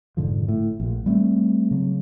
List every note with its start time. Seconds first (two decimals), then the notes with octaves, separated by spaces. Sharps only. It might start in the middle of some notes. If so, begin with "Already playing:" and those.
0.17 F1 G#2 D3 F3
0.48 A2
0.80 A#1 A#2
1.06 G3 A3 A#3 C4
1.71 C#3 F#3